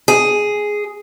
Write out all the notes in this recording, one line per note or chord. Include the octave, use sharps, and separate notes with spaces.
G#4